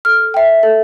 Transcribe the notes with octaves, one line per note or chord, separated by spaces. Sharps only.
A4 F6
E5 G5
A4